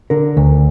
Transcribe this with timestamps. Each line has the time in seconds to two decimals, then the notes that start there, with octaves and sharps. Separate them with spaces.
0.10 D3 A#4
0.37 D2